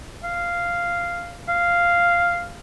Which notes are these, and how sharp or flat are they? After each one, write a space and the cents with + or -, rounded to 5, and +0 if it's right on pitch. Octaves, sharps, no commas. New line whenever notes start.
F5 -5
F5 -5